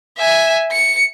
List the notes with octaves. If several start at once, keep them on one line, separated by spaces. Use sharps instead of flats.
E5 G#5
C#7